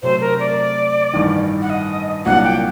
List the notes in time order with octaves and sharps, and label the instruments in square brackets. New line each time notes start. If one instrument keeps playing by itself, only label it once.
[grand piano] C3 F#3 A3 C4 [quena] C5
[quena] A#4
D5
[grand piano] A1 G2 D#3
[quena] F#5
D#5
[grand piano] C2 A#2 F#3 A#3 D4 [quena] F#5
[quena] G5